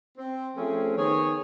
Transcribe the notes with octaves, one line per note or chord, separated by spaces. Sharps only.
C4
F3 A3 C4 C#4 G#4
D#3 B3 G#4 C#5